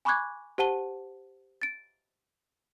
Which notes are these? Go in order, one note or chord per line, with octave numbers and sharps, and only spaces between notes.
G#5 B5 C#6 D6 F#6 G#6
G4 C5 F#5 A5 D#7 G7
A6 D7